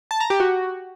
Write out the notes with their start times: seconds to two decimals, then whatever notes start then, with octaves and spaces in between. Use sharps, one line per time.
0.11 A5
0.20 A#5
0.30 G4
0.40 F#4